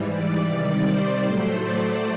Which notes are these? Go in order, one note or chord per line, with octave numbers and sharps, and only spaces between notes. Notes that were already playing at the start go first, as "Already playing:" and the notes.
Already playing: G#2 E3 G3
D5
C3 D#3 G3
C5
A2 F#3 A3
D5